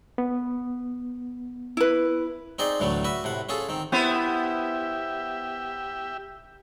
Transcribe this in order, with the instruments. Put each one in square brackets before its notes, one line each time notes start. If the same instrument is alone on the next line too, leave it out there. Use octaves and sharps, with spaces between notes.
[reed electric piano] B3
[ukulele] E4 B4
[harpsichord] C4 D#4 G#4 D5 C6
D2 A2 E3 F#3 A3
F#4 B4 E5
A2 C3 F#5
C#4 F4 G#4 A4
D#3 C4
[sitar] B3 E4 C5 [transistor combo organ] G4 E5